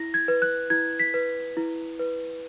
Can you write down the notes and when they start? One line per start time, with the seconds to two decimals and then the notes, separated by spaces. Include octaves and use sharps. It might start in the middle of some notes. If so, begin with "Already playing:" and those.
Already playing: E4 A#6
0.14 G#6
0.28 B4
0.42 F#6
0.70 E4 G#6
0.99 B6
1.14 B4
1.57 E4
1.99 B4